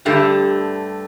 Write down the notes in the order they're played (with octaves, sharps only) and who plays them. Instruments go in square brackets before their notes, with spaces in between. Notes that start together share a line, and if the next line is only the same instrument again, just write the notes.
[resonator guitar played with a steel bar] G2 D3 A3 [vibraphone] G4